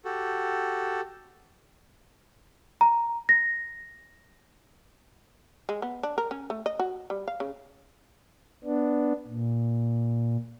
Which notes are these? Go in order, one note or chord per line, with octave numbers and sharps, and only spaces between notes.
F#4 G4 A4
A#5
A#6
G#3
B3
D4
A#4
C#4
A3
D#5
F#4
G3
F5
C#3
B3 D4
A#2